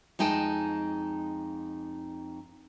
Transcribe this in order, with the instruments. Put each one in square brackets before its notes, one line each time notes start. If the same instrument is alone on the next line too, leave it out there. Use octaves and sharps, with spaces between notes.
[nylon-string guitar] F2 G#3 D#4 G5 A5